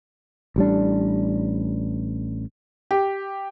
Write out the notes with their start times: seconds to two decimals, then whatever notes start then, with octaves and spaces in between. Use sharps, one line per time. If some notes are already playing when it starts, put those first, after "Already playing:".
0.56 A1 G3 D4
2.91 G4